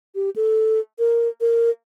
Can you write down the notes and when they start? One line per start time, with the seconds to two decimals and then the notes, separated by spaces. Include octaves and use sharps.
0.15 G4
0.36 A4
0.99 A#4
1.41 A#4